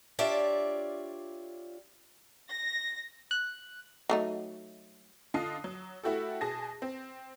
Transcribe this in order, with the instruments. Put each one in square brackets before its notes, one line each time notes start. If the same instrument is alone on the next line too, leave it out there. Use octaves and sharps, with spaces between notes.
[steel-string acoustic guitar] D4 F4 G4 C#5 D5 E5
[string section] A#6
[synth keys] F#6
[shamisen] F#3 A3 D#4
[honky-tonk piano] D3 F4 D#5 A5 D#6 C7
F#3
A3 E4 F#4 G4 A4
B2 G#4 A5 A#6
C4